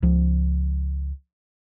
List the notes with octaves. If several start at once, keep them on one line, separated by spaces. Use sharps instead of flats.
C#2 F3